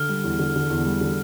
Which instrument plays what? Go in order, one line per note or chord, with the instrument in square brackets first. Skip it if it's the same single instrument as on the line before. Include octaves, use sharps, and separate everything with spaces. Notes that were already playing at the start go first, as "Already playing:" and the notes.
Already playing: [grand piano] D3 [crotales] F6
[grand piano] G3
E2
D3
D3
E2
G3
D3